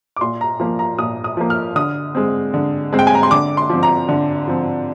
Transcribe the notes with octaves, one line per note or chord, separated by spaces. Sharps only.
D6
A#2 C6
A#5
F3 A#3
A#5
A#2 D#6
D#6
F3 A#3
F6
D3 D#6
G#3 C4
D3
G#3 C4
G5
G#5
A#5
C6
D3 D6
C6
F3 C4
A#5
D3
F3 C4